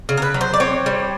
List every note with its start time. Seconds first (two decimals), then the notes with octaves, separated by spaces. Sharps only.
0.09 C#3
0.17 A#4
0.22 B4
0.34 F#3
0.41 C5
0.54 D5
0.60 C4 C#5
0.86 G3